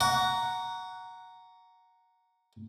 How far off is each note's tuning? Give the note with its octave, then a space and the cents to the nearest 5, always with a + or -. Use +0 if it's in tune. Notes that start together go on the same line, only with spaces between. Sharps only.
F#5 +0 A#5 +0 C#6 +35